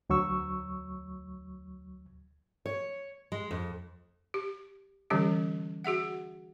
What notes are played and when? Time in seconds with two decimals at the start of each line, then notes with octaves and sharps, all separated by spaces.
0.10 D2 F#3 C#6 E6
2.66 C#5
3.32 G#3
3.51 F2
4.34 G4
5.10 D3 E3 G3 C#4 G4
5.84 F#4 G#4 E5 F#5